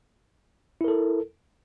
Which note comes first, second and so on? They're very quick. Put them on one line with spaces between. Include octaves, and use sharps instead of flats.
E4 A#4 A4